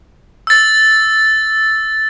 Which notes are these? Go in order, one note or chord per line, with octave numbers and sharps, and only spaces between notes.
E6 A6